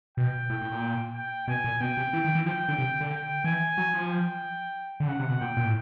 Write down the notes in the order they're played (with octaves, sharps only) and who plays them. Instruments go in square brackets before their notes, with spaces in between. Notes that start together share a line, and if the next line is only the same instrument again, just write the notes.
[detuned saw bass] B2 [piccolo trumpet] G5
[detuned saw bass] A2
A2
A#2
[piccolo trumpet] G5
[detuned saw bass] B2 [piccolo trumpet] G#5
[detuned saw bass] A#2
[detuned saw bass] B2 [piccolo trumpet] G5
[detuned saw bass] C3
E3
D#3
E3
[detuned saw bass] F3 [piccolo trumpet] G5
[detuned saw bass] D3
C3
D3
[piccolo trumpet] G5
[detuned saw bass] E3 [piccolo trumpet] G#5
[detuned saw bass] F#3
F3
[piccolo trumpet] G5
[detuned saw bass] D3
[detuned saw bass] C#3 [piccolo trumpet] F#5
[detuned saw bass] C3
B2
[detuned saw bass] A#2 [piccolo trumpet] G5
[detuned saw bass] A#2
A2